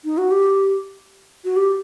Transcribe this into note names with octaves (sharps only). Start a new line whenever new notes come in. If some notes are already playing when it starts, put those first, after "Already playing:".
D#4
F#4
G4
F#4
G4